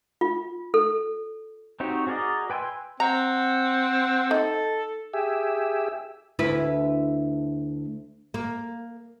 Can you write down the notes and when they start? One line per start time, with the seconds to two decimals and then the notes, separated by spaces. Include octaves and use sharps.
0.21 F4
0.74 A4
1.80 C4 D#4 F#4 G4 C#5
2.07 F#4 G#4 A#4 D5 D#5
2.50 B4 G5 G#5 C6 E6
3.00 C4 F#5 A#5
4.31 D#4 A4
5.13 G4 G#4 E5
6.39 D2 E4 B4
8.34 A#3